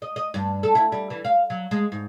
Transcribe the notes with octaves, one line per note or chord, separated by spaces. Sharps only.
D#5
D#5
G2
A4
E4
G3
E3
F5
F#3
G#3
G#2